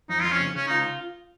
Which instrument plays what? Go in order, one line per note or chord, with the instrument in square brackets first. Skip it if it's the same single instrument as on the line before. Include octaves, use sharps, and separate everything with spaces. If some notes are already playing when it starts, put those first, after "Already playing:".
[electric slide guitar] F2 [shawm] D#4
[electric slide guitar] F2 [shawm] F4
[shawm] C#4
[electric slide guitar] C#3
[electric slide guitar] C#3 [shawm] C#4
[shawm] D#4 [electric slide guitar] F4